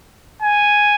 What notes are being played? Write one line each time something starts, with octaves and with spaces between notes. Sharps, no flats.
G#5